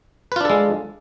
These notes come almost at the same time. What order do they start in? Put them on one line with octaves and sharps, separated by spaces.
B4 F4 D4 A4 G#3